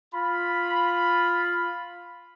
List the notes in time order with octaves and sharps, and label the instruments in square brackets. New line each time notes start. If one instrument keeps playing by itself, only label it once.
[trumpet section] F4 B5